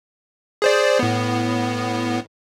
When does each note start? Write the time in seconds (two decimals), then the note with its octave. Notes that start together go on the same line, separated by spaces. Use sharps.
0.62 G#4 C5 D5
0.99 A2 B3